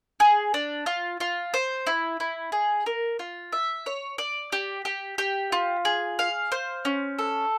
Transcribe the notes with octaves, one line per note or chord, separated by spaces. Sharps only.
G#4
D4
F4
F4
C5
E4
E4
G#4
A#4
F4
E5
C#5
D5
G4
G4
G4
F4
G#4
F5
C5
C#4
A4